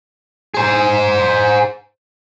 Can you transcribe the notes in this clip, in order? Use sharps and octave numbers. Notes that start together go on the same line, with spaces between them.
G#4 C5